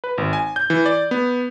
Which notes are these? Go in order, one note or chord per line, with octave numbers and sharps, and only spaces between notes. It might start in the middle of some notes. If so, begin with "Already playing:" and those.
B4
G#1
G#5
G6
E3
D5
B3